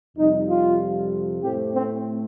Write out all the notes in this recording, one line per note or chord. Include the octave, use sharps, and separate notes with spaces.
F2 C3 G3 D#4
F4
A2 A3 C4 G4
C4